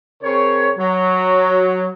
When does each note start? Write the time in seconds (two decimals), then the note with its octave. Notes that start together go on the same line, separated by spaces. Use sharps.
0.23 C#3 C4 A#4 C#5
0.78 F#3